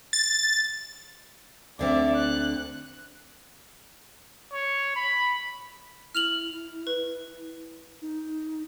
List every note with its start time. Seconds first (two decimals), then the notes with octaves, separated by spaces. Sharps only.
0.13 A6
1.79 D2 D3 C4 D5 E5
2.16 F#6
4.53 C#5
4.96 B5
6.15 E4 F6 F7 F#7
6.87 B4
8.02 D#4